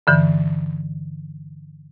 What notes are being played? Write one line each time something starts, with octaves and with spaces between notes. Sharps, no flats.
G2 D3 E3